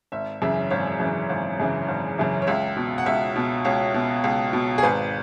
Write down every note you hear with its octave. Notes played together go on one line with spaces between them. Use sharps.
G#1 E5
F#2 C#3 E3 E5
G#1 C#5
F#2 C#3 E3
G#1
F#2 C#3 E3
G#1
F#2 C#3 E3
C#5
C#2 E5
B2
F#5
C#2 E5
B2
C#2 C#5
B2
C#2
B2
G#4
G#1 B4